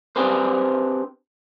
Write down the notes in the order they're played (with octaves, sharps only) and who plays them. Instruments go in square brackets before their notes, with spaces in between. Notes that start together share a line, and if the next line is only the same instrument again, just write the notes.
[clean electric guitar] C4 D4 G4 G#4 B4 C5